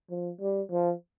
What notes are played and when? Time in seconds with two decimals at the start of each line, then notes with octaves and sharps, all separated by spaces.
0.10 F3
0.41 G3
0.71 F3